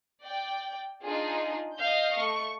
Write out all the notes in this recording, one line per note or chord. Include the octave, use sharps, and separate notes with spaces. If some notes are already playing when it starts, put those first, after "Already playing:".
D5 G5
D4 D#4 F4 G#4
D#5 F5 G6
A3 C#6